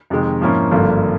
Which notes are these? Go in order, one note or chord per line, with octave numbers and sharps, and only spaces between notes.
F2 C3 D#3 G#3
G#2 F3 A#3 C#4 E4
G#1 G2 D3 F3 A#3